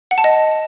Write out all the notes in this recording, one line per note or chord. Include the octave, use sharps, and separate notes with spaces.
F#5
A5
D#5